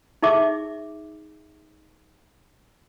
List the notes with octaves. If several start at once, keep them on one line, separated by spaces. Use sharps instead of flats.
D#4 G#4 E5 D6